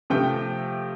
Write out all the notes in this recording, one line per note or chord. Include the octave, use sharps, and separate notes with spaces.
C3 F3 A3 G5